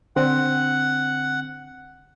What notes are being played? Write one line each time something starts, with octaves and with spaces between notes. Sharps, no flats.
D3 C4 F#5